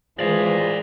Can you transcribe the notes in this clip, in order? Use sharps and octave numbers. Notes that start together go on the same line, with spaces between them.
E3 F3 G#3 G#4 D5 F5